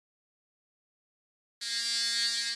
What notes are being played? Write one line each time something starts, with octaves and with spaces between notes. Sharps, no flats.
A#3